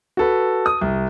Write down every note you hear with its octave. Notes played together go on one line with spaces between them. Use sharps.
F#4 A4 B4
D#6
C2